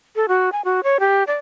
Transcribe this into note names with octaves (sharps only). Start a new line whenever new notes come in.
A4
F#4
G#5
F#4
C#5
G4
D5